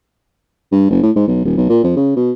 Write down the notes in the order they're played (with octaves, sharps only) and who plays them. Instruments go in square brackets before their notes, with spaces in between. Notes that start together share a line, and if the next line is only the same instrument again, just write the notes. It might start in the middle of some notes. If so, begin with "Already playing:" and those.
[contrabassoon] G2
F#1
A2
G#2
B1
D#1
B1
A#2
F2
C#3
B2